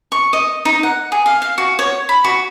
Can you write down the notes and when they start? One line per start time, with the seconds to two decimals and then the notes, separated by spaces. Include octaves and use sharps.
0.12 C#6
0.33 D#5
0.65 D#4
0.83 F#5
1.12 G#4
1.26 F5
1.42 F5
1.58 F#4
1.79 C#5
2.09 B5
2.24 F#4